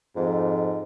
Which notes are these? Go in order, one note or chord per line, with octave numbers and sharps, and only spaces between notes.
F2 G#2